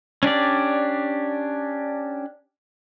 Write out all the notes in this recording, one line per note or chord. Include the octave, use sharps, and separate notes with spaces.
C#4 D4 G4 D5